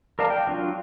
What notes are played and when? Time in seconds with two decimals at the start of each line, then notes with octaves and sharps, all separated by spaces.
0.19 A#4 D5 F5 A5 A#5
0.30 G5
0.47 F#3 D4 F4